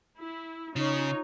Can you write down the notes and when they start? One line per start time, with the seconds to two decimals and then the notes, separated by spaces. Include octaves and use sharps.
0.18 E4
0.76 C#3 D#4 F4 C#5